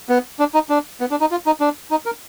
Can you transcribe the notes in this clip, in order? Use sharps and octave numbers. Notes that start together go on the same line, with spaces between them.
B3
D4
D#4
D4
B3
D4
D#4
F4
D#4
D4
D#4
A#4